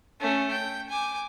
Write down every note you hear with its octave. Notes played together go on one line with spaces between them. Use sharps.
A3 C#4
G5
G#5 D6